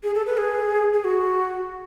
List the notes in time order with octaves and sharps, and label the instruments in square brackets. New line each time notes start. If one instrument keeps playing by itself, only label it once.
[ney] G#4
A4
B4
G#4
G#4
F#4